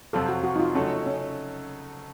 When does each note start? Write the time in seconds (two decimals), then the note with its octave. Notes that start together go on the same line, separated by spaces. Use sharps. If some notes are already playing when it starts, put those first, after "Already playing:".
0.13 F2 C3 F#3 C4 F4 A4
0.29 F#4
0.44 F#4
0.56 D#4
0.60 F4
0.75 C#3 F#3 A3 C#4 D#4 A4
1.06 C#4